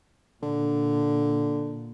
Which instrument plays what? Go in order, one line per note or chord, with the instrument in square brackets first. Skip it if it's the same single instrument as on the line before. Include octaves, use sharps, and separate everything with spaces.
[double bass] A#2 [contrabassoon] D3